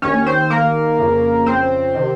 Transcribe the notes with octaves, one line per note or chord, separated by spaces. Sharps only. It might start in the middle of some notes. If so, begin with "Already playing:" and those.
D#2 D#3 C#4 C#5
C4 C5
A#3 A#4
F2 C#3
C4 C5
C3 D#3